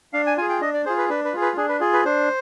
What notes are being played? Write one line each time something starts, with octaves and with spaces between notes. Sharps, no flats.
D4 F5
G#5
F4 G#4 G#5
G5
D4 D#5
D5
F4 G#4 C5
B4
D4 B4
B4
F4 G#4
B4
D4 G#4
B4
F4 G#4
B4
D4 C5